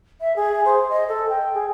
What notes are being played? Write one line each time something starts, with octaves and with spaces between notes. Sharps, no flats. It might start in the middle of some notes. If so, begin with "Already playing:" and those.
E5
G#4
C5
D#5
A4
G5
G#4